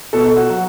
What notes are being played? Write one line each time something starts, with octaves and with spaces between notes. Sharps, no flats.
B2 A4
F#4
F#3